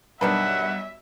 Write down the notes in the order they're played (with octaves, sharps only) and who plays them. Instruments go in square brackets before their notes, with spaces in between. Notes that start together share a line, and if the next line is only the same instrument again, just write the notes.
[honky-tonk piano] B1 G2 [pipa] D#3 D4 B4 [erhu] E5 [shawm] F#5